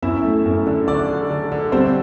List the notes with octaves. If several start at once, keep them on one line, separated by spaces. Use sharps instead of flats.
F#2 E4 E5
A3
F#2
D3
D3 D4 D5
D3
D3
D3
G3 C4 C5